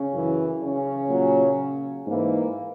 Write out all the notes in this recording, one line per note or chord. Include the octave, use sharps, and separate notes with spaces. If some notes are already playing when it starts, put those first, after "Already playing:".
Already playing: C#3 C#4
F#2 E3
C#3 C#4
A#2 F#3
G#2 E3 A#3